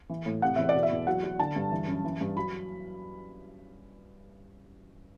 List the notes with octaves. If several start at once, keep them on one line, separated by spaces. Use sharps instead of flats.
E3
A2
C3 F#5
E2 E5
D5
B2
E5
E2
F#3 F#5
F#3
D3 A5
G2
E3
F#2
E3
G2
F#3 B5